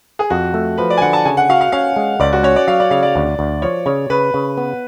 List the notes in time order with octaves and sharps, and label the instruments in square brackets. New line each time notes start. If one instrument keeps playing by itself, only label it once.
[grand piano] G#4
[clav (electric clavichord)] F2 [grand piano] F#4
[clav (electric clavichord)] A3
[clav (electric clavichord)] F3 [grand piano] B4
[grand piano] D5
G#5
[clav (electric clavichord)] D3 [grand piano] F#5
[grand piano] A5
[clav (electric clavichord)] C#3 [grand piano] G#5
[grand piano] F#5
[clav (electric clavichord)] F#4 [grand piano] F5
[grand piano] F5
[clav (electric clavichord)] C#4 [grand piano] F5
[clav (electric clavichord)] G#3
[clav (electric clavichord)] C#2 [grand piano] D5
[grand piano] F#4
[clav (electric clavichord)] C#4 [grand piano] C#5
[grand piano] D5
[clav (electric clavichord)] F#3 [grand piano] F5
[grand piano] D5
[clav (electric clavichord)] C#3 [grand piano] F5
[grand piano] D5
[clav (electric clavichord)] D2
D2
[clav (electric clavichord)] F3 [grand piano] C#5
[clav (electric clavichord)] C#3 [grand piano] C#5
[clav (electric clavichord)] C#3 [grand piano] B4
[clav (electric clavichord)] C#3
B3